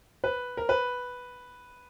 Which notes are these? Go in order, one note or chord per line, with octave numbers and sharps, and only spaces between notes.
B4
A#4
B4